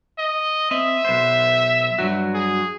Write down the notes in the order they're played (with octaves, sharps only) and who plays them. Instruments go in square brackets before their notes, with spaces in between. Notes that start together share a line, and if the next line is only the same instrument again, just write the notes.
[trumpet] D#5
[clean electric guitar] C4 D#5 [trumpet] E5
[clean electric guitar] B1 B3 C5
G2 F#3 F#4
[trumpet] G#4